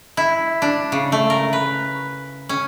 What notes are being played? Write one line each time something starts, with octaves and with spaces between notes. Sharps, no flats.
E4
D4
C#3
A3
A#4
B4
C#4